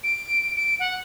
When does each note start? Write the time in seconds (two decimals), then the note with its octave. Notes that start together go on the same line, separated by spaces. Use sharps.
0.03 D7
0.56 D7
0.79 F#5